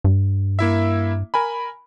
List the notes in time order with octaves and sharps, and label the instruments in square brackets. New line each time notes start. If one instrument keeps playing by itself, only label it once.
[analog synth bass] G2
[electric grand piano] A#3 E4 E5
A#4 G#5 B5